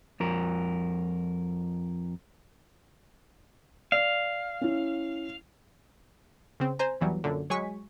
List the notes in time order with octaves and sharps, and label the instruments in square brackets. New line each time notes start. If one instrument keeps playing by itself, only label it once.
[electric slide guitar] F2 A#4
[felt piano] D5 [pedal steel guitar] F5
[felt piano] C#4 E4
[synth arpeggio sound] C#3 C4
C5 G#5 A#5
E2 E3 F#3 G3
F#2 A#2 D3
F#3 G#3 G#5 C#6 B6